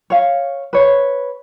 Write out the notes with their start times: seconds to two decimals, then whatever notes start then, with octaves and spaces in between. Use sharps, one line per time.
0.10 C#5 F5
0.73 B4 C#5